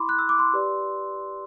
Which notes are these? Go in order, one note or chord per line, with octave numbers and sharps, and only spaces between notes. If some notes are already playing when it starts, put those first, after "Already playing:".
Already playing: E4 B5 C6 D6
F#6
E6
D6
C6 E6
G4 B4 D5